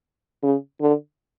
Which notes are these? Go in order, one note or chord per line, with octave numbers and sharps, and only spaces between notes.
C#3
D3